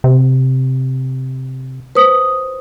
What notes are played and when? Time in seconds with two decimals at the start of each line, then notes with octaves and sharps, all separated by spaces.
0.04 C3
1.95 B4 C5 D#6